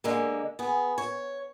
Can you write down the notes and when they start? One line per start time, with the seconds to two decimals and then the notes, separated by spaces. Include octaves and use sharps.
0.04 D3 G#3 A#3
0.59 B3 G#4
0.98 C#5